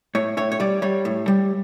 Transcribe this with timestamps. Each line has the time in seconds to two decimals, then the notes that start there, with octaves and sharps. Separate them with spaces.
0.15 A2 C#5
0.37 A2 C#5
0.52 C#5
0.60 G3 D5
0.82 G3 C#5
1.05 A2
1.28 G3